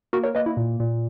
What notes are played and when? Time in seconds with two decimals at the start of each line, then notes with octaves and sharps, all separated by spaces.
0.13 A#3 F#4 A#4
0.23 A#4 C#5
0.35 A#3 B4 D#5
0.46 E4
0.57 A#2
0.80 A#2